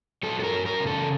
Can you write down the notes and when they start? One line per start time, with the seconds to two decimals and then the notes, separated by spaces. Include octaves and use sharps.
0.23 F#3 A4
0.40 A4
0.44 A#4
0.52 F#2
0.66 A#4
0.80 C#3
0.87 A4